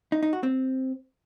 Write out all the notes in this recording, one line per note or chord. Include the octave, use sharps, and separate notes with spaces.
D#4
D#4
F#4
C4